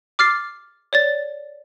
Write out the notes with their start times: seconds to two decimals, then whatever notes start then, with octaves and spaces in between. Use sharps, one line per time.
0.19 D6 F6 A6 C7
0.93 C#5 D5 A6